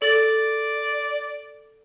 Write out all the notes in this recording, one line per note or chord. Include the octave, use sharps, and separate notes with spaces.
A4 D5 A6